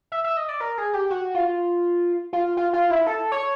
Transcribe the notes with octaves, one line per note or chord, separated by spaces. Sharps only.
E5
E5
D#5
D5
A#4
G#4
G4
F#4
F4
F4
F4
F4
E4
A4
C#5